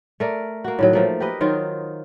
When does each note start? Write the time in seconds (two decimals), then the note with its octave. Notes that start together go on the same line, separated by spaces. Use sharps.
0.20 A3 A#4 D5
0.64 A#3 F#4
0.79 A2 D#3 F#3
0.93 F3 A3 A#3
1.20 G4 A#4 B4 D#5
1.41 D#3 F#3 F4 C5